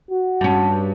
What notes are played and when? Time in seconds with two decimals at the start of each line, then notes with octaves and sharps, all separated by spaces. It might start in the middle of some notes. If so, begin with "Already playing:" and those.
0.11 F#4
0.41 G2 C#4